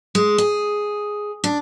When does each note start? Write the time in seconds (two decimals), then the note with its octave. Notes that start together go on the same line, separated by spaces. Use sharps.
0.15 G#3
0.38 G#4
1.44 D4